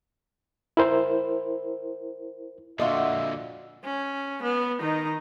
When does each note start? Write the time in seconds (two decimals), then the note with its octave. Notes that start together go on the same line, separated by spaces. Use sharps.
0.77 E4 A#4 C5
2.80 A#2 D3 D4 F4 F#4 D#5 E5
3.84 C#4
4.42 B3
4.80 D#3 D#4